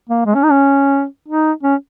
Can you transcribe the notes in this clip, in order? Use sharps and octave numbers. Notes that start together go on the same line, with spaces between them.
A#3
G#3
C#4
D#4
C#4
D#4
C#4